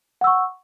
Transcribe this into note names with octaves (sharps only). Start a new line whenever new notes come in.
F#5 C#6 E6